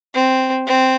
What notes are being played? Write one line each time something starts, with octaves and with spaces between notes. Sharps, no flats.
C4
C4